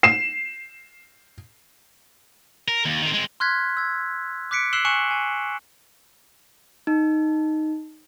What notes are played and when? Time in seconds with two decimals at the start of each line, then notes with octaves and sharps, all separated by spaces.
0.03 C7 E7
2.68 A#4
2.85 D#2
3.02 D#3 C4
3.14 G#3 C4
3.40 C6 F6 F#6 G#6 B6
3.77 E6 G#6
4.51 D6 F#6 B6 C#7 D7
4.73 E6 F#6 C7 E7 F#7 G7
4.85 G#5 C#6 F#6 C#7 E7 F#7
5.11 G#5
6.87 D#4